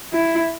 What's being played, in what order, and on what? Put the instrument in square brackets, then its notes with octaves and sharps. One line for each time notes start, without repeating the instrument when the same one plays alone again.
[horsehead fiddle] E4